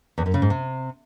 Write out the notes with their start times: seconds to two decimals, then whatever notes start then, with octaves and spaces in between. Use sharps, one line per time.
0.18 E2
0.26 F#2
0.34 C#3
0.42 G#2
0.50 C3